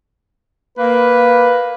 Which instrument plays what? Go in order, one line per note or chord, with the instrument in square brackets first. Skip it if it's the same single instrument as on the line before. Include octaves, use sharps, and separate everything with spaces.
[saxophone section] A#3 [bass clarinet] B4